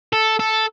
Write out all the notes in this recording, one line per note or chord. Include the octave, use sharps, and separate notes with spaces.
A4
A4